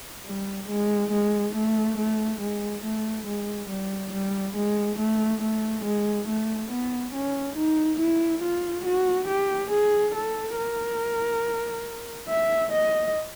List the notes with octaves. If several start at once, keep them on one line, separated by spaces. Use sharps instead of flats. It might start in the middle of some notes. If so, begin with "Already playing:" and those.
G3
G#3
G#3
A3
A3
G#3
A3
G#3
G3
G3
G#3
A3
A3
G#3
A3
B3
C#4
D#4
E4
F4
F#4
G4
G#4
A4
A#4
E5
D#5